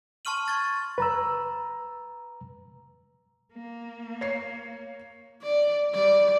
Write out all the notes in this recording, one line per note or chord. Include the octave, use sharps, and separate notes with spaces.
A5 C6 C#6 F6 D#7 F#7
C#6 G#6 A6
B4 A#5 E6
A#3
C#5 C7
D5
G3 D5